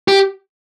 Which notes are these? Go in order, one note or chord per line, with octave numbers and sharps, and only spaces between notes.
G4